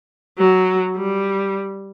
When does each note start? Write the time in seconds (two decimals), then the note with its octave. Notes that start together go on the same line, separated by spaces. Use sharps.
0.39 F#3
0.96 G3